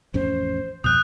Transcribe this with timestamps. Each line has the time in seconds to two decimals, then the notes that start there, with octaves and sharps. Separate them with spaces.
0.14 A1 F2 C#4 C5
0.84 F2 B2 D#6 F#6 G6